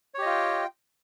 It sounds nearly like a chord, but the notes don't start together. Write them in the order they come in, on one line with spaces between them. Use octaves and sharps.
C#5 G4 D#5 F4 G5